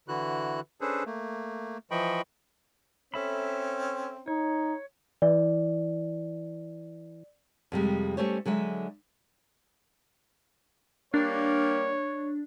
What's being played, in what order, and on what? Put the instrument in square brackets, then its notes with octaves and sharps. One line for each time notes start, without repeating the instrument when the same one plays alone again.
[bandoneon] D3 E3 E4 F#4 F#6
C#4 D4 G#4 A4 B4 C5
A3 A#3
E3 F3 D#5 G5 B5 C#6
[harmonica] C4 C#4 [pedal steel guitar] A4 E5 B5
[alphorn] D#4 [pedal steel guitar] C#5
[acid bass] E3 [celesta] D5
[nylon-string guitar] F2 C3 G3 G#3
G3 A3 C#4 C5 C#5
D3 F#3 G#3 E5
[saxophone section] G3 A#3 [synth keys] D4 [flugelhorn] C#5